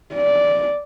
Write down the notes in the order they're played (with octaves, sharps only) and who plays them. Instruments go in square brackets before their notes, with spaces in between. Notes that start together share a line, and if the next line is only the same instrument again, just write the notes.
[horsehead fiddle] D5